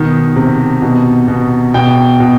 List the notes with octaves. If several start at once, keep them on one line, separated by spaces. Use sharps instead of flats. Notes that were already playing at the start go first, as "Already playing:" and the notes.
Already playing: B2 D#3
C3
B2
B2
B2 G5
B2